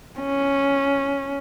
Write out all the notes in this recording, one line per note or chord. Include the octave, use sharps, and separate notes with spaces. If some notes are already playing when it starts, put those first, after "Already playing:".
C#4